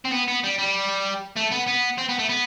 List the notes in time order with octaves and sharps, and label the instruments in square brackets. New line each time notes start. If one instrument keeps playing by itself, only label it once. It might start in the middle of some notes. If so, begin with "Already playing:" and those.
[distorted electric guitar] C4
B3
B3
G3
G3
A3
B3
B3
C4
B3
A3
B3